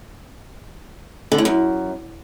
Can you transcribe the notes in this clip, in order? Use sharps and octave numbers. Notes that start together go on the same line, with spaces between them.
D3
A2
F#2